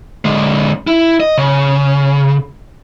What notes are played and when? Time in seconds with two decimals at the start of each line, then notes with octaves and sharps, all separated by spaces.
0.25 D3 G#3
0.87 E4
1.20 D#5
1.38 C#3